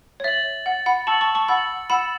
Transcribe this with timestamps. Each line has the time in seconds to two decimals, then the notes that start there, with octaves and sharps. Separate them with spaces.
0.20 C#5
0.24 E5 A6 F#7
0.66 F#5 A6 F#7
0.86 F#5 B5
1.07 A5 C#6 E6 A6 C#7 F#7
1.21 A5 C#6
1.35 A5 C#6
1.49 F#5 B5 E6 A6 C#7 F#7
1.90 F#5 B5 E6 C#7 E7